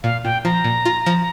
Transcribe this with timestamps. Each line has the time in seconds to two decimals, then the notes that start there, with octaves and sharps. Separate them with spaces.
0.03 A#2 F5
0.24 A#2 G5
0.45 F3 A#5
0.64 A#2
0.85 F4
1.06 F3